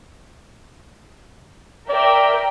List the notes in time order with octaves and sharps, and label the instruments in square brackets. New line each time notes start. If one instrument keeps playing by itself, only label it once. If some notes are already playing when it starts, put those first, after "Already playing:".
[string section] A#4 E5 G5 [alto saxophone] D5